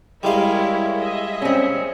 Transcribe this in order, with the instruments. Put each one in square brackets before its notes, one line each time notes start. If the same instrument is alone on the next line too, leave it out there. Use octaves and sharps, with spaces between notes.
[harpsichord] G3 G#3 F5 [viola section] E4 A#4 C#5
[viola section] G#4 D#5 E5
[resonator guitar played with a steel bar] C4 C#4